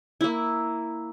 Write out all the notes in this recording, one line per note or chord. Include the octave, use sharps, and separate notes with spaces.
A#3 E4